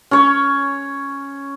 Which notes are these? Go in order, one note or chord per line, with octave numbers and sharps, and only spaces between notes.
C#4 C#5